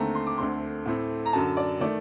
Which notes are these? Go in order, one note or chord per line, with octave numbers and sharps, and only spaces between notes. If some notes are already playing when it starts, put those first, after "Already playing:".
Already playing: D#2 D3 A3 C4 A#5
C6
D6
D2 D3 A3 C4 C6
A2 A3 C4
A#5
F#2 D3 F#3 A5
D5
D#3 A3 D5